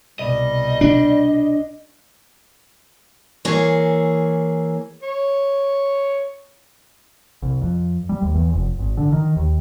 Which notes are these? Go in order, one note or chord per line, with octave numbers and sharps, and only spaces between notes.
C2 B2 G3 D#5
D4
E3 A#3 G#4 C#5
C#5
C2
F2
G3
D#2
E2
F1
G#1
D3
D#3
D#2